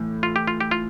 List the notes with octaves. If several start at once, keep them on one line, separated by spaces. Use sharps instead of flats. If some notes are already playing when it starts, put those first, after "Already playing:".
Already playing: A2 E3
F4
G4
F4
G4
F4